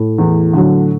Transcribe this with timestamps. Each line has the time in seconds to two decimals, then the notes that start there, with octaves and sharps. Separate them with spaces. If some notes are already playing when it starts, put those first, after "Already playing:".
Already playing: A2
0.18 E2
0.53 D3 F#3